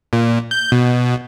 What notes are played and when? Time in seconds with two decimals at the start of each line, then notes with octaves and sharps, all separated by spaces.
0.13 A#2
0.51 G6
0.72 B2